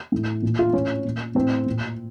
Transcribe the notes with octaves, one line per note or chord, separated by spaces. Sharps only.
A2
A#2
F4
A2 C#4
A#2
A2 C4
A#2